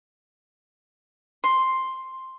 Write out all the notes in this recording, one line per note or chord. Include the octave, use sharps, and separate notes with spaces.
C6